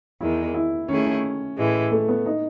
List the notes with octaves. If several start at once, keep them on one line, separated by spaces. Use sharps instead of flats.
E2 D#3 G#3 E4
E4
D#3 A3 C#4 E4 G#4
C#4
A2 E3 G#3
A3
B3
D#4